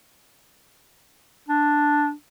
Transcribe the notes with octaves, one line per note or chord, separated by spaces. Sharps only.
D4